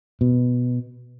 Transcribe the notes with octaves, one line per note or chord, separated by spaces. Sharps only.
B2